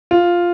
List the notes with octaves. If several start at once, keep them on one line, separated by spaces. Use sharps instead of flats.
F4